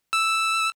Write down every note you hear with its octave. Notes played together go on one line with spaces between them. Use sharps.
E6